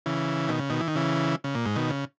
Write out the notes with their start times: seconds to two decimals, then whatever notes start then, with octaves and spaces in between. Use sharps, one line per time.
0.06 C#3 E3
0.48 B2 D#3
0.59 C#3
0.70 B2 D#3
0.80 E3
0.88 D#3
0.95 C#3 E3
1.44 C#3
1.55 A#2
1.65 G#2
1.76 B2 D#3
1.90 C#3